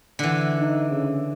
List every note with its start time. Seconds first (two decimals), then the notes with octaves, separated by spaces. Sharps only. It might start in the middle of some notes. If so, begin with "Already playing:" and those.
0.19 D3 E3
0.59 D#4
0.91 C#3